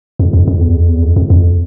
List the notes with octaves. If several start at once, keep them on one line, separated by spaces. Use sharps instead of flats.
F2
F2
F2
E2
F2
E2
F2
F2
F2